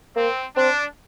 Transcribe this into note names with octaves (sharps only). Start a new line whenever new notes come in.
A#3 C4
C4 D4